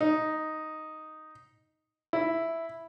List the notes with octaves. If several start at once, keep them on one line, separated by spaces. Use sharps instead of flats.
D#4
E4